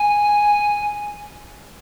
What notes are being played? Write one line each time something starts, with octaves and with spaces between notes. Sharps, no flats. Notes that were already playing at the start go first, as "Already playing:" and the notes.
Already playing: G#5